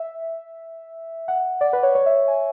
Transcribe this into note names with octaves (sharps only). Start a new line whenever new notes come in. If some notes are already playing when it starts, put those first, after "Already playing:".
Already playing: E5
F#5
D5
B4
C#5
C#5
E5
G#5